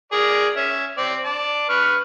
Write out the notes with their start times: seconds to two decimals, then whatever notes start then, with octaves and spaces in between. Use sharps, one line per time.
0.12 G#4 A#4 D5
0.56 C#4 E5
0.98 C4 D5
1.24 D5 A5
1.69 B4 C#6 F6